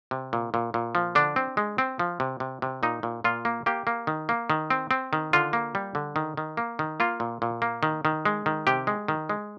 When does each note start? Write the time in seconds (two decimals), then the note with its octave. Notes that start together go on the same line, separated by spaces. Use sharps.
0.11 C3
0.33 A#2
0.54 A#2
0.74 A#2
0.95 F3
1.15 D3 D4
1.36 C4
1.57 G#3
1.78 C4
1.99 F3
2.20 C3
2.40 C3
2.62 C3
2.83 A#2 D#4
3.03 A#2
3.24 A#2 F4
3.45 A#3
3.66 A#3 G4
3.87 A#3
4.07 D#3
4.29 A#3
4.50 D#3
4.70 C4
4.91 C4
5.13 D#3
5.33 D3 F4
5.53 A#3
5.75 G3
5.95 D3
6.16 D#3
6.37 D#3
6.57 A#3
6.79 D#3
7.00 A#3 F4
7.20 A#2
7.42 A#2
7.62 A#3
7.83 D#3
8.05 D#3
8.25 G#3
8.46 D#3
8.67 C3 G4
8.87 G#3
9.08 D#3
9.29 G#3